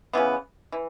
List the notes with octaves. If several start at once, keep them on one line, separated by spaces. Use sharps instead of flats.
C#3 E3 B3
E3